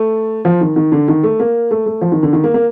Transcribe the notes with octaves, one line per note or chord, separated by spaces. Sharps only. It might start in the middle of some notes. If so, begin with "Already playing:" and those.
Already playing: A3
F3
D#3
D#3
D3
D#3
A3
A#3
A3
A3
F3
D#3
D3
D#3
A#3
A#3